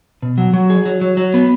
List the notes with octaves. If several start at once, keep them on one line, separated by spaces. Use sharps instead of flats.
B2
F#3
F#3
G#4
F#3
F#3
F#3
B3